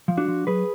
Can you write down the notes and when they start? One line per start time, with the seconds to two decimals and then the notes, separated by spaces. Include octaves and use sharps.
0.08 F3
0.17 D4 F#4
0.28 F3
0.47 F#3 G#4 B4